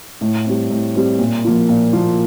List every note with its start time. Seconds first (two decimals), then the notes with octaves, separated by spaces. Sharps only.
0.21 A2
0.45 G3 C4
0.70 A2
0.95 G3 C4
1.19 A#2
1.44 F3 A#3 F4
1.69 A#2
1.93 F3 A#3 F4